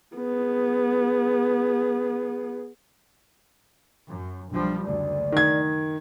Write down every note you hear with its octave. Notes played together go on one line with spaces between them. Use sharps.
B3 G#4
F#2
B1 F3 G3 D4
F#1 D2 D5
D#3 G#6